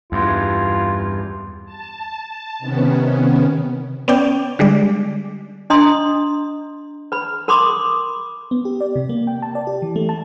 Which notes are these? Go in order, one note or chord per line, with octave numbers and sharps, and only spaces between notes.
E2 G2 F4
A5
C3 D#3 B3 C#4
B3 C#4 D5 G5
D3 G3 G#3 D5
D4 D#5 A#5 C6 D#6
B4 B5
A#4 B5 C6 D6 D#6
B3
G4
D5
C3
A#3
G5
A5
D5
G4
E3
A3
A5